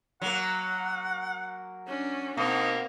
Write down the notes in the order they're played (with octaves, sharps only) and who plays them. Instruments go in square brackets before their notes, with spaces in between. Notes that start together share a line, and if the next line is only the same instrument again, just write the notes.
[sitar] F#3 A#3 [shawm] F#5
[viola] C#4 D4
[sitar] B2 [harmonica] A#3 [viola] C4 [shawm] D#4